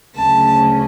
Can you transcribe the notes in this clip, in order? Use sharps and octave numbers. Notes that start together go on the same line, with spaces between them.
D2 C#3 F#3 A3 C#4 A5